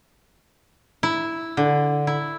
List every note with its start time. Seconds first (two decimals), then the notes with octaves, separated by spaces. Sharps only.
1.03 E4
1.57 D3
2.07 E4